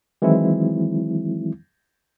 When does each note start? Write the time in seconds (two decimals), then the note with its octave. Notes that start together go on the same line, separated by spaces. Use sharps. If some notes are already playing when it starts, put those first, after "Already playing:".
0.22 D#3 E3 F#3 G#3 C4 E4